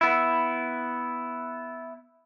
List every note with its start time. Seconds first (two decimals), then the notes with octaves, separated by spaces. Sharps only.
0.01 B3 E4